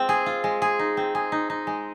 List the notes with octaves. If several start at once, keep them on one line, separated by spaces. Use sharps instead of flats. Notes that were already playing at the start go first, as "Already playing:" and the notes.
Already playing: G#3 C4 F4
G#4
F4
G#3
G#4
D#4
C4
G#4
D#4
D#4
G#3